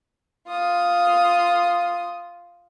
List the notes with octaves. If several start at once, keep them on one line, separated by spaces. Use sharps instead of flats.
F4 D#6